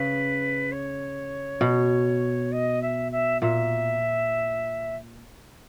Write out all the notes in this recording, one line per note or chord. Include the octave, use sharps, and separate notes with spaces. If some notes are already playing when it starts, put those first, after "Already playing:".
Already playing: C#3 B4
C#5
B2
D#5
E5
E5
A#2 E5